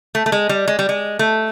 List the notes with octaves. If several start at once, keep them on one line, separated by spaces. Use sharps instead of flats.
A3
A3
G#3
G3
G#3
G3
G#3
A3